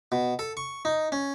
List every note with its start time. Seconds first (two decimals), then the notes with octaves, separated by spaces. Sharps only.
0.12 B2
0.39 A4
0.57 C#6
0.85 D#4
1.12 C#4